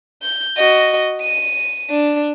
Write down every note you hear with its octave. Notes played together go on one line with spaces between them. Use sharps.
G6
F#4 D#5
D#7
D4